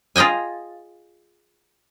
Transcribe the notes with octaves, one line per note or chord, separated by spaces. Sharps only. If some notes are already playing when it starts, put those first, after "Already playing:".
F4 G#4 D#5 G5 G#5